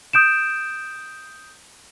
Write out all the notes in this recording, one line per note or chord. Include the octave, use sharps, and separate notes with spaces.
D#6 G6 D7 E7